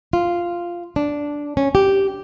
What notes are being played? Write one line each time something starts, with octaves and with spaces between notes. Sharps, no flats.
F4
D4
C#4
G4